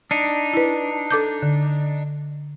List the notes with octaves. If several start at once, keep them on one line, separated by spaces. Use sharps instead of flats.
D4 D#4
E4 B4
A4 D6 G6
D3